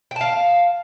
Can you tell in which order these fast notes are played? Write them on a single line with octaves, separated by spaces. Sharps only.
G5 A5 F5